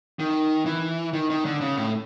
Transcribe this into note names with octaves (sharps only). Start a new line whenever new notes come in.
D#3
E3
D#3
D#3
D3
C#3
A2